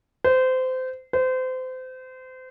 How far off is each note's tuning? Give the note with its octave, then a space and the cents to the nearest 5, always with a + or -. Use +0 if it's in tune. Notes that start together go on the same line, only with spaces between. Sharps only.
C5 -25
C5 -30